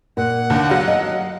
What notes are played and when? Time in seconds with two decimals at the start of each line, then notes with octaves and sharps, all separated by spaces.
0.17 A#2 F#5
0.50 D#2 D3
0.69 F#3 F5
0.88 D#5